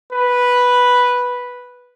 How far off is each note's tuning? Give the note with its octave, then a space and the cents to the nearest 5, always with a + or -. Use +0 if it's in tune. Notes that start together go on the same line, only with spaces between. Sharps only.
B4 -5